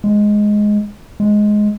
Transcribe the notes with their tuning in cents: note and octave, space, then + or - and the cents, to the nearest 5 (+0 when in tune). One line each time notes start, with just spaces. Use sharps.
G#3 +5
G#3 +10